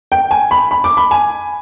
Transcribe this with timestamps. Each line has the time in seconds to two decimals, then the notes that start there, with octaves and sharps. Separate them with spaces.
0.12 G5
0.31 G#5
0.51 B5
0.71 B5
0.84 D6
0.97 B5
1.11 G#5